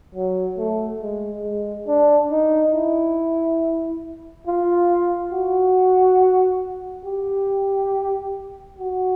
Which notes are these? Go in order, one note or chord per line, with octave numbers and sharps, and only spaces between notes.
F#3
A3
G#3
G#3
D4
D#4
E4
F4
F#4
G4
F#4